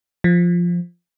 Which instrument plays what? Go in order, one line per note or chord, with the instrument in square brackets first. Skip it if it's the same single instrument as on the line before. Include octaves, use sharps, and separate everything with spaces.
[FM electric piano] F3